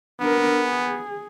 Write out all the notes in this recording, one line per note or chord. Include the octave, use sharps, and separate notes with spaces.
B3 D4 A#4
G#4